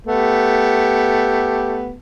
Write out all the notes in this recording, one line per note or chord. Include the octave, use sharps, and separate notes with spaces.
A3 B3 G4